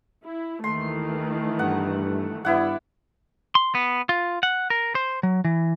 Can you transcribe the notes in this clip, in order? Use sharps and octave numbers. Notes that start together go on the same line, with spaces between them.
E4
D#2 D#3 E3 A3 C6
G2 F#5
G2 B3 E4 D5 F#5
C6
B3
F4
F#5
A#4
C5
F#3
E3